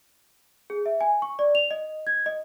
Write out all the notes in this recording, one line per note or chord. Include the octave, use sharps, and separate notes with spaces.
G#4
E5
G#5
C#6
D5
F7
D#5
G#6
D#5